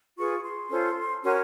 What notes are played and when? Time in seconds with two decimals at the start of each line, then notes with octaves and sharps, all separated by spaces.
0.17 F4 G#4 B4 C#6
0.44 C6
0.70 C#4 F4 A4 C5
1.23 C#4 F#4 A#4 C#5 C6